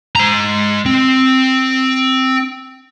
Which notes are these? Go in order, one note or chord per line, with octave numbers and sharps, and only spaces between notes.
G#3 A#5
C4